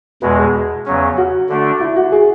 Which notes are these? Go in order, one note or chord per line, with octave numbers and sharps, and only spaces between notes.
E2 B2 G#3 B4
G#4
E2 C#3 F#3 C#4
F#4
D3 A3 D4
E4
F#4
G#4